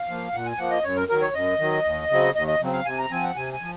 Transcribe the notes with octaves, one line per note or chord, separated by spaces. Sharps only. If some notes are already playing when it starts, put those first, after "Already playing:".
Already playing: F5
F3 A#3
A#2 F#5
G#5
F3 A#3 F#5
D#5
F#2 C#5
A#4
D#3 F#3 A#4
C#5
F#2 D#5
D#3 F#3
D#2
C#3 F#3 C4
D#2 D#5
D#5
C#3 F#3 C4
F5
C3 G#5
A#5
F3 C4 G#5
F#5
C3 G#5
G#5
F3